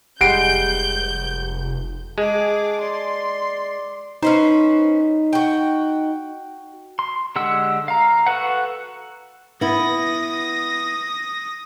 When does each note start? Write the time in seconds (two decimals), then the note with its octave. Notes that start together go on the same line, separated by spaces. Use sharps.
0.21 F1 G3 G#3 F#5 G6 C7 D7
2.18 G#3 G#4 A5 D6
2.81 D5 C6
4.23 C#4 D#4 B4 C5
5.33 F#4 G5
6.99 C6
7.36 D3 G#3 G4 F#5 E6
7.88 F5 A#5
8.27 F#4 A4 B4 F#5
9.61 B3 E4 D#6 A#6